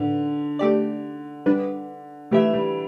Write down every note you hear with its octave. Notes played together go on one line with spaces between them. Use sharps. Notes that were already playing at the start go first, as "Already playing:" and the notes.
Already playing: A2 D3 B4
A3 G4 D5
G3 D4 B4
E3 A3 G4 E5
G3